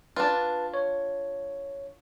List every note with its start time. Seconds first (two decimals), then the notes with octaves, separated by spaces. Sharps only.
0.16 D4 F4 B4 A5
0.74 C#5